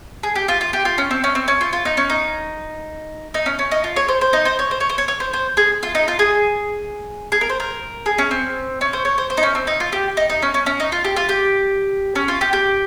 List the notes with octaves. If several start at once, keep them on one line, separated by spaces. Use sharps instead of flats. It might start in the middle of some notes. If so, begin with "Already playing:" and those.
G#4
G4
F4
F4
G4
F4
C#4
C4
C#4
C4
C#4
F4
F4
D#4
C#4
D#4
D#4
C#4
C#4
D#4
F4
C#5
C5
C5
D#4
C5
C#5
C5
C#5
C5
C#5
C#5
C5
C5
G#4
F4
D#4
F4
G#4
G#4
A#4
C5
A#4
G#4
C#4
C4
C#4
C5
C#5
C5
C5
D#4
C#4
C4
D#4
F4
G4
D#4
D#4
C#4
C#4
C#4
D#4
F4
G4
F4
G4
C#4
F4
G4
G4